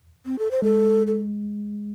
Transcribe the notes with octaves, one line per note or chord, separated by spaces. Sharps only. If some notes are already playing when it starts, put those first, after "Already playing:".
C4
A4
C5
G#3 A4
A4